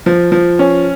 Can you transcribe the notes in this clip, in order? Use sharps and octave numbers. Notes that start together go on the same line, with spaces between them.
F3
F3
C#4